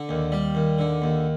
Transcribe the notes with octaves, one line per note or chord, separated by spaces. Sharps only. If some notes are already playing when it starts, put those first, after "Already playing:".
Already playing: D3
D#2
G3
D#2
D3
D#2